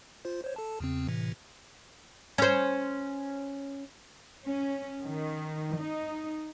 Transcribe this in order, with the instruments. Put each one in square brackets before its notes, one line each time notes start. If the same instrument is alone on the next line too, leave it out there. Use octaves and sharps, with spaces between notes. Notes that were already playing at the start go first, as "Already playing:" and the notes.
[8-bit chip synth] F4 C5
C5 C#5
A4 A5
E2 C#3 C4
A2 C3 E3
[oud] C#4 C5
[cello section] C#4
D#3
D#4